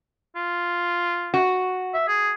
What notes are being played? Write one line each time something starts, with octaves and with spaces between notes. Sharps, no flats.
F4
F#4
E5
G#4